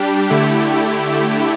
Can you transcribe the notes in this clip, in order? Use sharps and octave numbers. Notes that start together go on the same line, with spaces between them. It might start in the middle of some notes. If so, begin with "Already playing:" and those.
Already playing: G3 D4 G4
D3 A3 E4 G4